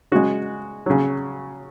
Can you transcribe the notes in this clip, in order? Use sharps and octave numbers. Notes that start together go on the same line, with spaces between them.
C#3 G#3 F#4
C#3 F#3